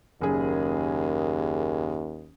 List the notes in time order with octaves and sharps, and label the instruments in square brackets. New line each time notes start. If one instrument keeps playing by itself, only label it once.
[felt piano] F#1 G#4 [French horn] D#2